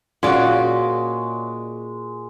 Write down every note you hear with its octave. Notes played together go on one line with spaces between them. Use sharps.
A#2 G#3 C#4 F#4 D5